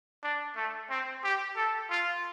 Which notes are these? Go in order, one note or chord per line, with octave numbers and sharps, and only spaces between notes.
D4
A3
C4
G4
A4
F4